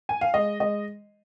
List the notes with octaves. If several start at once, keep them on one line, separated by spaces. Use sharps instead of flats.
G#5
F5
G#3 D#5
G#3 D#5